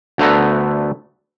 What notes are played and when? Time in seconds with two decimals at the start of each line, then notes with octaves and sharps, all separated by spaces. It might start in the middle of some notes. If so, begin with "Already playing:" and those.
0.18 D2 D3 A3 B3 A#5